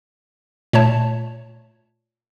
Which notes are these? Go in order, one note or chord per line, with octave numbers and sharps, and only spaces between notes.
A#2 A3 C#5 A5